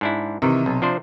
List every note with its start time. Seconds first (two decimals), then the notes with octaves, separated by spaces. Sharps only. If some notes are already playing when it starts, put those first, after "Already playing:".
0.01 G#2 D4 E4
0.42 C3 D#3 E3
0.66 B1
0.82 F3 D4 C5